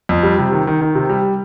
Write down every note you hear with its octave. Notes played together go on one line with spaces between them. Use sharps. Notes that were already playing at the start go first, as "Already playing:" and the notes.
F2
G3
C3
D#3
D#3
D#3
C3
G3